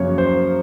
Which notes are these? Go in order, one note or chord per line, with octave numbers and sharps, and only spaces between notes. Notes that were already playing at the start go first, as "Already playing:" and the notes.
Already playing: F#2 C#3 F3 A#3 C#5
C5